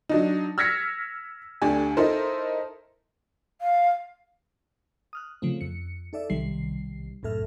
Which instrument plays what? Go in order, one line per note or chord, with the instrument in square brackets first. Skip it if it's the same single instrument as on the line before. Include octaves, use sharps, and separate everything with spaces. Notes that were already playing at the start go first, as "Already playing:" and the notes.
[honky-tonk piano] F#3 D4 D#4
E6 F6 G#6 A#6 B6 C#7
D2 D4 G4 G#5
D#4 E4 A4 A#4 C5
[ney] F5
[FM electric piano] D#6 F6 F#6
C#3 F3 A3 C4
F2 C#7
D#4 A4 D5 E5
B1 C3 D#3 G3 C7
C2 F#2 A2 A4 E5 F6